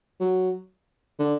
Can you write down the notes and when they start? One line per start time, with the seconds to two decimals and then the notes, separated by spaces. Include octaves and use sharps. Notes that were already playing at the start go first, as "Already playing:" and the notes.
0.20 F#3
1.19 D3